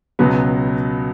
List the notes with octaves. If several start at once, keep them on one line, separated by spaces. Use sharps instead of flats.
C#2 B2 F#3 B3